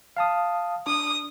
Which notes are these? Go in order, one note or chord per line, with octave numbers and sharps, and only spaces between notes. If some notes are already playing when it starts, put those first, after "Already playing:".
F5 A5 D#6
D4 D#6